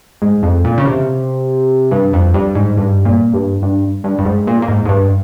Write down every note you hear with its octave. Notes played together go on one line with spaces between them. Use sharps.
G#2
F2
A#2
C#3
C3
G2
F2
G2
G#2
G2
A#2
G2
G2
G2
G2
G#2
A#2
A#2
G#2
G#2
G2